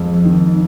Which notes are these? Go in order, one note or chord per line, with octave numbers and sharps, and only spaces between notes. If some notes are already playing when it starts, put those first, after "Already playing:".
Already playing: F2 G#3
D#3